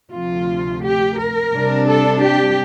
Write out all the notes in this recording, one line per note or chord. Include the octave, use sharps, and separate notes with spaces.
D2 C3 F3 A3 F4
G4
A#4
C3 G3 D4
A4
G4